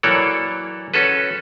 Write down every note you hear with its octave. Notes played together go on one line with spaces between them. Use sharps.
E3 F#3 A#3 A4 C#5 D5
C#4 F#4 A4 B4